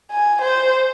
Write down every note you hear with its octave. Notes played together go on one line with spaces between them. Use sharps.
G#5
C5